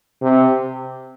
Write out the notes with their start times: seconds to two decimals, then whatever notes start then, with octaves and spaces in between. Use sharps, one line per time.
0.21 C3